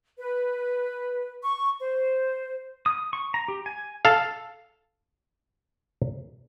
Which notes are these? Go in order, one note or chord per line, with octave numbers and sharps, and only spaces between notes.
B4
C#6
C5
D#6
C#6
A#5
G4
G#5
A4 F5